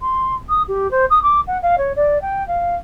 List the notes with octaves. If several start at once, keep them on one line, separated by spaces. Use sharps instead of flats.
C6
D#6
G4
C5
D#6
D6
F#5
F5
C#5
D5
G5
F5